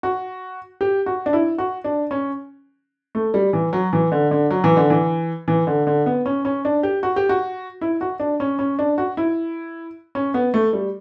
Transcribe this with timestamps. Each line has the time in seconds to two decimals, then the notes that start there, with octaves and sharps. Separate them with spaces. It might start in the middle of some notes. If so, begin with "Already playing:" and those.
0.03 F#4
0.81 G4
1.06 F#4
1.26 D4
1.33 E4
1.58 F#4
1.84 D4
2.11 C#4
3.15 A3
3.34 G3
3.53 E3
3.73 F#3
3.93 E3
4.12 D3
4.31 D3
4.50 F#3
4.64 E3
4.77 D3
4.90 E3
5.48 E3
5.67 D3
5.87 D3
6.06 B3
6.26 C#4
6.45 C#4
6.65 D4
6.83 G4
7.03 F#4
7.16 G4
7.29 F#4
7.81 E4
8.01 F#4
8.20 D4
8.40 C#4
8.59 C#4
8.79 D4
8.98 F#4
9.17 E4
10.15 C#4
10.34 B3
10.54 A3
10.73 G3